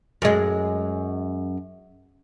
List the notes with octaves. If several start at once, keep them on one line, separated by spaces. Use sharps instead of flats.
F#2 G#3